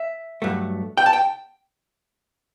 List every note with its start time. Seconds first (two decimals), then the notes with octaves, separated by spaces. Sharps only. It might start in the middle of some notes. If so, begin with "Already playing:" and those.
Already playing: E5
0.42 G2 F#3 A3
0.97 G5
1.06 A5
1.13 G5